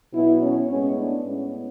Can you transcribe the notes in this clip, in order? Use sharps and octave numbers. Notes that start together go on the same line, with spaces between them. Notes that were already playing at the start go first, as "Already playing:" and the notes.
B2 F#3 B3 E4
C#4
A2 G#3 B3 C#4
D4
A2 G#3 B3 C#4